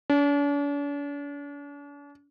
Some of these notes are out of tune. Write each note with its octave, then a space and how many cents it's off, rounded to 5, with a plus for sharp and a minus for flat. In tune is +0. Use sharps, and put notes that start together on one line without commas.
D4 -45